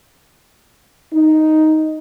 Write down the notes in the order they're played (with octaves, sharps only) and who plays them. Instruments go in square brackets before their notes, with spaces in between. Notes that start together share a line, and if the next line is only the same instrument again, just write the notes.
[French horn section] D#4